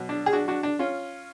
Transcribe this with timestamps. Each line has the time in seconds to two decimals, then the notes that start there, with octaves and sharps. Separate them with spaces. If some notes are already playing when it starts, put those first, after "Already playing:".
Already playing: B2 F#3
0.09 D4
0.26 G#4
0.33 D4 F#4
0.48 D4 F#4
0.63 D4
0.79 C#4 F4